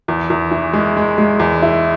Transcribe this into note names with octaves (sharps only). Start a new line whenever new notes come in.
E2
E2
E3
G#3
G#3
G#3
E2
E4